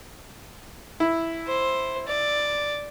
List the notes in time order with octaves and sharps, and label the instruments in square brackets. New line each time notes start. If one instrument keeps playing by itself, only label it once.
[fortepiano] E4
[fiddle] C5
D5